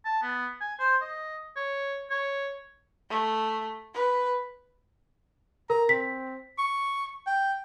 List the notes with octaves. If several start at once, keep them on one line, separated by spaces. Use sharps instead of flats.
A5
B3
G#5
C5
D#5
C#5
C#5
A3
B4
A#4 A#5
C4 B6
C#6
G5